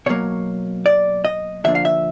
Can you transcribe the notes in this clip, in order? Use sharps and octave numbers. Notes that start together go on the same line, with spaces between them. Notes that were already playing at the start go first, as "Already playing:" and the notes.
B2 F#3 A#3 C#5
D5
D#5
D3 F3 A#3 D4 E5
F5
E5